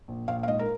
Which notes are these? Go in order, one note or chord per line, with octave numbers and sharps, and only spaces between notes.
A#1
A#1 F5
F5
G#2 D#5
A#4